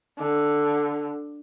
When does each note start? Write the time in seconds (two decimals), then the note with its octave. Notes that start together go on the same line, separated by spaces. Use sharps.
0.18 D3